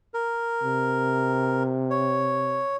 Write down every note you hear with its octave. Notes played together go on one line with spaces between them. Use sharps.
A#4
C3
C#5